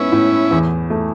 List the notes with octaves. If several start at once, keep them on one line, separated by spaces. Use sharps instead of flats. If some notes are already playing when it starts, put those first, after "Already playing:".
Already playing: G#2 B3 C#4 E4
A2
E2
A3